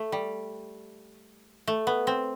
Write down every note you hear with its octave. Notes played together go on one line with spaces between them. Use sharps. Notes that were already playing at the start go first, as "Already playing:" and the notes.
Already playing: A3
G3
A3
B3
C4